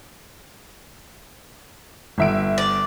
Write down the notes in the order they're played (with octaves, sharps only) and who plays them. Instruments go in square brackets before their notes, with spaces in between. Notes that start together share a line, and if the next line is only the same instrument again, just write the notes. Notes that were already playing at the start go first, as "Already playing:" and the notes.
[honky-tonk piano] G1 E5 D7
[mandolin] D5